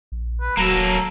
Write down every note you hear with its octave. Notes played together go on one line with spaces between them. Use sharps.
A#1
B4
D#1 F#3 A#3 A4 A#5